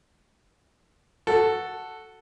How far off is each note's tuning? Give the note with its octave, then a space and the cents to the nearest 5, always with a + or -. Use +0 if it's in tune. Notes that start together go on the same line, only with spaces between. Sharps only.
F#4 +0 A4 +0